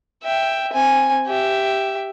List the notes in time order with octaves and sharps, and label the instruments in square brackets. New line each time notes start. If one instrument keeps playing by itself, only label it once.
[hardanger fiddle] E5 G5
C4 G#5
G4 E5